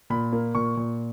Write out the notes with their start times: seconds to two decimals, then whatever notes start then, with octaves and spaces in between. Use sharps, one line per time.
0.10 A#2 B5
0.32 A#3
0.55 A#2 C#6
0.77 A#2